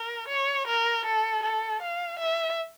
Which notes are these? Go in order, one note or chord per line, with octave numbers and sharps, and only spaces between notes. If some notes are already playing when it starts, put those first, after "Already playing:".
Already playing: A#4
C#5
A#4
A4
A4
F5
E5